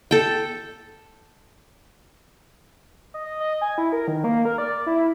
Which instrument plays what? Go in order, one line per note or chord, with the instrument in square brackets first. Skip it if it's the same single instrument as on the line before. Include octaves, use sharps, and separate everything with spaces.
[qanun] A4 G5
[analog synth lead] D#5
D#5
G#5
E4
A#4
D#3
A#3
A#4
D5
E4